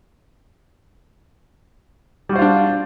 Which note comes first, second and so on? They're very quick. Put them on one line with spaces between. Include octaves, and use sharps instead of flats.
G3 F#4 C5 F4 D4